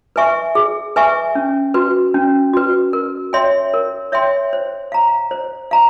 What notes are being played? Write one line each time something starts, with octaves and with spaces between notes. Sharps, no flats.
B4 E5 G#5 C#6
G#4
B4 E5 G#5 C#6
C#4
F#4 B4
C#4
F#4 B4
A#4
C#5 E5 G5 C6
A#4
C#5 E5 G5 C6
C5
F5 A#5
C5
F5 A#5